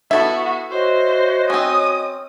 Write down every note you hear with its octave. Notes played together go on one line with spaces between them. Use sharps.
B3 E4 F#4 A4 E5
F#4 C5 C#5 D#5
C4 C#4 D#6